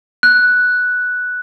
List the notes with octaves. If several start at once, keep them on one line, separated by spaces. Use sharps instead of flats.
F#6